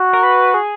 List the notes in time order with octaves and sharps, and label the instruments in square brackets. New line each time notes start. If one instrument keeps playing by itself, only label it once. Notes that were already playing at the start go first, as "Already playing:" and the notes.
Already playing: [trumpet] F#4
[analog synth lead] A#4
B4
G#4